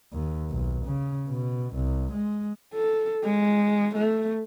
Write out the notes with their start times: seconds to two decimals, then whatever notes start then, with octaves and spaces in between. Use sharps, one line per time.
0.13 D#2
0.50 B1
0.86 C#3
1.28 B2
1.75 C2
2.13 G#3
2.74 A4
3.25 G#3
3.96 A3